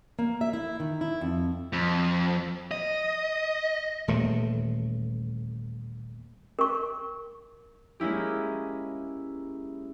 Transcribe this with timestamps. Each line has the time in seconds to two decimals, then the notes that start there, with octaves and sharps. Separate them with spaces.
0.19 A#3
0.41 E5
0.53 E4
0.80 D#3
1.01 E4
1.21 F2
1.73 F2
2.71 D#5
4.08 D#1 E2 A2 A3
6.59 A#4 C#6
8.00 G#3 A#3 C#4 E4 G4